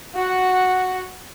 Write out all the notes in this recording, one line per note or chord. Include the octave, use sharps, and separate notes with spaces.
F#4 F#5